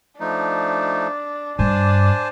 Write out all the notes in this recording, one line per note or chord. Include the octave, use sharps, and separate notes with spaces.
F3 A3 D4 D#4
G2 D4 C5 G#5 A5